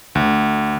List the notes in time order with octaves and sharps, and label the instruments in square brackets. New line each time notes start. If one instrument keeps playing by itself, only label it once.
[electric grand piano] D2